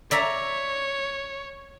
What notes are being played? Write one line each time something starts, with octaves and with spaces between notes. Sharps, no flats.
C#5 D5 E5 A#5